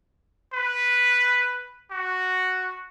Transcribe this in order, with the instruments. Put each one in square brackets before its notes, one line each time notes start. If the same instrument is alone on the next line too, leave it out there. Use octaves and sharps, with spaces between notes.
[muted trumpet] B4
F#4